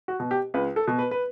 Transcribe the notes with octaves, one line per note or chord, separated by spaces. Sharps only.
F#4
B2
G4
C#2 B4
A4
B2
B4
B4